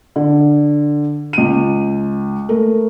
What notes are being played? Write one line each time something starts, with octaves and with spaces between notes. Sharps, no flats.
D3
C#2 D#7
A3 A#4